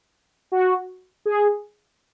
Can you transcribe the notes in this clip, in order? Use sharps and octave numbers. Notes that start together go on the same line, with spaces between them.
F#4
G#4